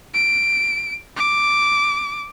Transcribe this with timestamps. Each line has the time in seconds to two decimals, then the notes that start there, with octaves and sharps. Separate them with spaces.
0.14 D7
1.16 D6